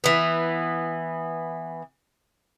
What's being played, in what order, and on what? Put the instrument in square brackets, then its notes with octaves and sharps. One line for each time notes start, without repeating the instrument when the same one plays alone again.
[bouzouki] E3 B3